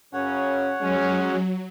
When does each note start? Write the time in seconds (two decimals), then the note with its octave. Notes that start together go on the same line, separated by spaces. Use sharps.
0.13 F#2 C#3 C#4 C#5 F#5
0.81 F#3 G#3 C#4